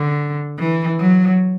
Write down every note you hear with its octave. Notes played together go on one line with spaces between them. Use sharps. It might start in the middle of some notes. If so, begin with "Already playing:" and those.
Already playing: D3
E3
F#3